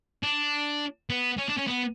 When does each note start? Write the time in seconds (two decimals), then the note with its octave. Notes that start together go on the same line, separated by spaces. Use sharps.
0.23 D4
1.10 B3
1.38 C#4
1.49 D4
1.58 C#4
1.67 B3